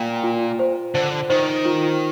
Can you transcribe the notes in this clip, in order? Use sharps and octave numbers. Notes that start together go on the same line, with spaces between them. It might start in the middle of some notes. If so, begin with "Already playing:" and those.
Already playing: A#2 F4 G5
F4
C5
D3 C5
D#3 C5
F4